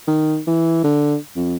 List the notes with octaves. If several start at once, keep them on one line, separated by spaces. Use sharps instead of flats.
D#3
E3
D3
F2